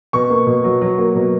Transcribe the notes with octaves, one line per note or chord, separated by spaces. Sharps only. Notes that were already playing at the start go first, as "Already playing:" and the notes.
B2 C#6
A#3
B2
F#3
F#3
A#3
B2